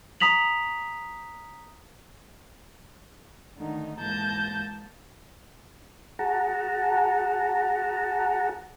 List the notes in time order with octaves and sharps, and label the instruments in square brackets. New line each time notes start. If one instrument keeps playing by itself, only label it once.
[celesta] A#5 D#6 B6 F7 F#7
[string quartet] D3 D#3 A3 D#4
G#2 E3 A#3 A5 G6 A#6
[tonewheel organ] F#4 G#4 F#5 A5 A#5